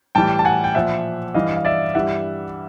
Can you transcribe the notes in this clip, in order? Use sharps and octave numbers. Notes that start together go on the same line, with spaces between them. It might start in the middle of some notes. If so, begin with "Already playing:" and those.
A2 E3 G3 G5 A5
A5
F#5 G#5
G5
A#2 F3 E5 F#5
G2 E3 G3 D#5 F5
F5
D5 E5
G2 E3 G3 E5 F#5